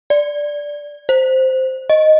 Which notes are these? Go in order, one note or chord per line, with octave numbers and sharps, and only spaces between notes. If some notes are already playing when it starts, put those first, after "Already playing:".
D5
C5
D#5